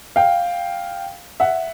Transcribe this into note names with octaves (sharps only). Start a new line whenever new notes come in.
F5 G5
E5 F#5